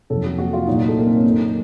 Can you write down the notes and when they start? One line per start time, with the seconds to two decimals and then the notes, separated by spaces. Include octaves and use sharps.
0.10 F2 C3 D#3 F#3 A4
0.24 F#4
0.38 F#4
0.53 F4
0.67 C2 A#2 F#3 D#4
0.88 A3
0.98 A#3
1.06 C4
1.15 C#4
1.24 F#2 D#3 F#3 D#4